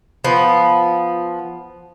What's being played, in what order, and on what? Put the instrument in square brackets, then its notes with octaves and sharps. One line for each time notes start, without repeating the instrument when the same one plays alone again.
[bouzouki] F3 B3